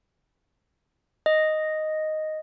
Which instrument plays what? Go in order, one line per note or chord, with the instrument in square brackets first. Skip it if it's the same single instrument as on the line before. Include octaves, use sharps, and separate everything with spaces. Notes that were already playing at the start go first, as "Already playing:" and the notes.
[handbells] D#5